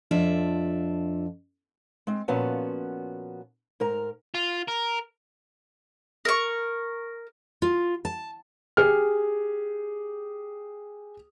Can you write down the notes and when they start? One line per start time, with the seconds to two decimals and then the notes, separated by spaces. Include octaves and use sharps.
0.11 F2 D4 F4 E5
2.07 G#3 C4
2.28 A#2 F3 B3 C#4 F#4 A5
3.80 G#2 A#4 A#5
4.34 F4
4.68 A#4
6.25 A#4 C#6
7.62 F4
8.05 A5
8.77 G4 G#4 F6